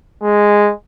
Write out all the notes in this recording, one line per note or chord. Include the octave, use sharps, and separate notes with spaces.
G#3